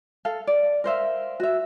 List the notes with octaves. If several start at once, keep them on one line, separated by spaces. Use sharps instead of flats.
A4 F5
D5
A#4 C5 E5 F5
F#4 E5